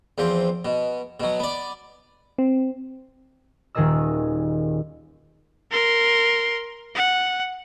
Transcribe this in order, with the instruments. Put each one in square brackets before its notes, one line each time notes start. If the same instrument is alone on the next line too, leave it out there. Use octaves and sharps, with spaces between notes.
[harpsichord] E2 F3 C4
B2
B2 F#3
B3 D5
[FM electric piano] C4
[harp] D#1 D#3 G#4 A#4 D#5 E6
[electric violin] A#4 C6
F#5